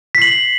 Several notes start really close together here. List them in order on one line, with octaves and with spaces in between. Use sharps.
B6 C7 F#7